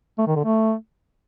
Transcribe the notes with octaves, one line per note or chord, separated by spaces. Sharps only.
A3
D#3
D3
A3